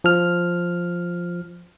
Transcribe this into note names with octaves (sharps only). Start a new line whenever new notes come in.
F3 F6